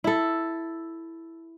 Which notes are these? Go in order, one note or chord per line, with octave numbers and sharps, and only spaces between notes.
E4 A4